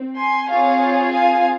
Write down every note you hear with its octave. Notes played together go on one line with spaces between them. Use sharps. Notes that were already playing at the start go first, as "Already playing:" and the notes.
Already playing: C4
G#5 C6
C4 F4 G#4 C#5 F5
F5 G#5